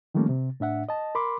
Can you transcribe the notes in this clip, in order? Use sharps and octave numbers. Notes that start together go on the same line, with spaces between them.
D#3 F3 G3 A3 A#3 C#4
C3
A2 D4 E5 F#5
D#5 A5
A#4 B5 C6 D6